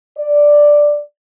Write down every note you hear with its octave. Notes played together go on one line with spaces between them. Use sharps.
D5